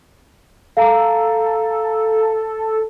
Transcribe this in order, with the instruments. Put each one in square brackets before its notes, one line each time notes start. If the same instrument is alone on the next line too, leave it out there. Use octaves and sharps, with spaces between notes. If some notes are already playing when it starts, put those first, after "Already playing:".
[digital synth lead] A4 [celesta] F5 A#5